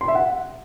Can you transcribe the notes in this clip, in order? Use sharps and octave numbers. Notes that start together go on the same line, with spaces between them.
C6
E5
F#5